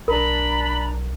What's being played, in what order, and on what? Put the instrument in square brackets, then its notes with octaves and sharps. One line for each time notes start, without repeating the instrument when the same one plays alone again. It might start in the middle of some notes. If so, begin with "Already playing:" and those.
[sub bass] B1 [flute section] D4 A#5 [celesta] A#4 [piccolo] B5